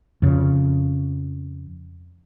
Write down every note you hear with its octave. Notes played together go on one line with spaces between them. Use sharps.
F2 C#3